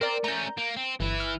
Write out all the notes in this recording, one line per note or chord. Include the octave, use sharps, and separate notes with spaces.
C4 A#4 D5
A3 C#4 A#5 G6
A#3
C4
G1 E3 E4
F6